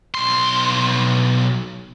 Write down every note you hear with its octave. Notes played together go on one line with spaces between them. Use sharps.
B1 C6